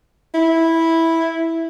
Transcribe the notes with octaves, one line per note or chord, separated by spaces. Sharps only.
E4